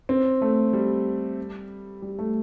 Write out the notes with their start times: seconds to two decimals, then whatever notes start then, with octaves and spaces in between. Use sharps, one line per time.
0.09 C4
0.42 A3
0.73 G3
2.02 G3
2.19 A3